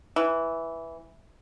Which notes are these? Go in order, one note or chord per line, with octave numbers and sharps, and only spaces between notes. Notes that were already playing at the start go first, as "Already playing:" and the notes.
E3